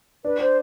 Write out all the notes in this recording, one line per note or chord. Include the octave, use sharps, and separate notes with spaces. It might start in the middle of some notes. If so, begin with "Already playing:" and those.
D4 B4
C5